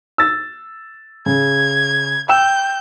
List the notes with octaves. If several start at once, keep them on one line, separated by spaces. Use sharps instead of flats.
E6 A6
C#3 G#6
G5 E6 G6 E7